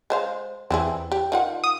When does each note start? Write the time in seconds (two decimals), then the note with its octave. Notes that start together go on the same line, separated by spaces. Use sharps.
0.10 G#3 C5 F5
0.70 E2 C4 E4 G#4
1.12 G4
1.32 D#3 F4 F#5
1.64 D#6